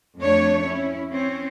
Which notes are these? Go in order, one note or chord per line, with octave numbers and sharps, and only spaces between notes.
F2 A3 D4 C#5
C#4 E4
C4 C#4